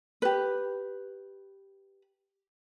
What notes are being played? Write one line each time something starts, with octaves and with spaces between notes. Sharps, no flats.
G4 B4